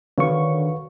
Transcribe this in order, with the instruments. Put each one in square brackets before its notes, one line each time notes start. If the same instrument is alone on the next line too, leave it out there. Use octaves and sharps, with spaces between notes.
[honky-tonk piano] D3 [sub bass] D#3 [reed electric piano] F#4 B4 F5 [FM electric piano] C#5 C#6